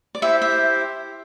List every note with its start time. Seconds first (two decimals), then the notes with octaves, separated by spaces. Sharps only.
0.15 D5
0.22 E4 G4 C5 E5
0.42 E5